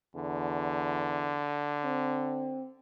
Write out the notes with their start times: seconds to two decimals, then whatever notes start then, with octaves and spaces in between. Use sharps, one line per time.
0.15 E2 D3
1.84 C4